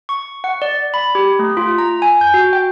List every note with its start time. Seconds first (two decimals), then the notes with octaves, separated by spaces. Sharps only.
0.09 C#6
0.44 F#5
0.62 D5
0.94 B5
1.15 G4
1.39 A3
1.57 F4
1.78 A#5
2.02 G#5
2.21 G6
2.34 F#4
2.53 G5